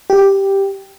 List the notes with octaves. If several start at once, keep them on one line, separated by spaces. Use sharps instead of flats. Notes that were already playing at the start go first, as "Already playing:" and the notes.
G4